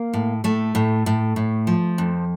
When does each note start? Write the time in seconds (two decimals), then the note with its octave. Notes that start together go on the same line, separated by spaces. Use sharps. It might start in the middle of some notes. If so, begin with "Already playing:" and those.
Already playing: A#3
0.14 A2
0.44 A2 A3
0.75 A2
1.06 A2
1.36 A2
1.67 F3
1.98 F2